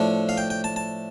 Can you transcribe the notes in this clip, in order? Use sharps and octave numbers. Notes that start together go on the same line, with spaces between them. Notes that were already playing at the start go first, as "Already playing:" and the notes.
Already playing: A2 F3 A3 D4
F5
G5
G5
A5
A5